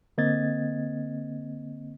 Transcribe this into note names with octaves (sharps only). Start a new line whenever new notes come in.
D3 A#3 C4 D#5 G#6 A6